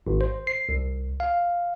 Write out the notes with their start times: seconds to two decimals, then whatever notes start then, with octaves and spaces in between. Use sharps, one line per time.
0.07 G#1
0.21 C5
0.47 C7
0.69 C2
1.20 F5